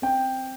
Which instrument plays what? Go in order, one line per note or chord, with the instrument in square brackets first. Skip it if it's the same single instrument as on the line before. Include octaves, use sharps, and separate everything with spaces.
[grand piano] C4 G5